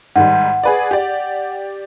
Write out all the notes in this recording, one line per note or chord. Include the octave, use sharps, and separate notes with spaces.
G#2 D#3 G3 F#5
G#4 B4 D5
G4 D5